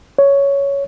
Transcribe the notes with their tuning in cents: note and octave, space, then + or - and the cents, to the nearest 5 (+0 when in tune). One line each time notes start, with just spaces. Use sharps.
C#5 +10